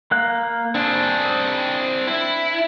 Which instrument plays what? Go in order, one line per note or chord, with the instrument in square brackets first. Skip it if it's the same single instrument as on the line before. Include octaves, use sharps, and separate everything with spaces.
[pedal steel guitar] A#3 F5 F#6
[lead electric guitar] C4 G#4 [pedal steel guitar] D4
[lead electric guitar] E4